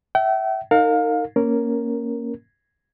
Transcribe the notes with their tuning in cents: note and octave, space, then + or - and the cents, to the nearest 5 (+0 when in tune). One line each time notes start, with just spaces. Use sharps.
E5 +0 G5 -40
D#4 +0 A#4 -35 F5 +25
A#3 +0 C#4 +0 A#4 +0